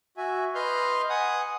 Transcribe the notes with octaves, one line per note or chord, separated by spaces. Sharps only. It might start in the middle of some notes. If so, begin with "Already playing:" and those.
F#4 E5 G#5
B4 D#5 C6 F6 G6
F#5 G#5 D#6